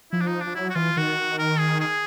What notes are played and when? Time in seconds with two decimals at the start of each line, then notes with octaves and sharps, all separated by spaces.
0.12 F3 E4
0.21 D4
0.26 D#4
0.40 D4
0.47 F3
0.55 F#3 E4
0.70 F#4
0.75 E3 F4
0.97 D#3 F#4
1.39 A#4
1.59 G#4
1.80 G#4